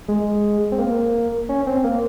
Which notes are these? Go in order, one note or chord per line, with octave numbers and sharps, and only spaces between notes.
G#3
C4
A#3
C#4
C4
A#3